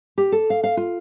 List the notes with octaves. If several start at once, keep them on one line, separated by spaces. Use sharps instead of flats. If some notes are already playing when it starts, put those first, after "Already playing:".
G4
A4
F5
F5
F4